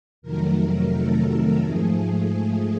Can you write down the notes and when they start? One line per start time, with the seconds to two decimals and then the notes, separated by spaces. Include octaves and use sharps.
0.22 F2 C3 D#3 F#3 A3 A#4
0.57 A#4
0.91 A4
1.62 G#2 F3 A3 G#4